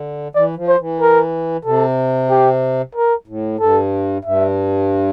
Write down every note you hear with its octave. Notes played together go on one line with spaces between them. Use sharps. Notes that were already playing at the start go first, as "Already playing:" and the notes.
Already playing: D3
E3 D5
F3
C5
E3
A#4
C3 A4
G4
A#4
A2
G2 A4
G2 E5